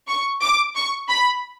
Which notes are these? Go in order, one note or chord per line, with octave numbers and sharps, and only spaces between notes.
C#6
D6
C#6
B5